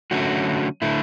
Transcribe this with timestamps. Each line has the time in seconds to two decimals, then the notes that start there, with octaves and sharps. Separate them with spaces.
0.11 D3 F#3 A3 C#4 F#4
0.82 D3 A3 E4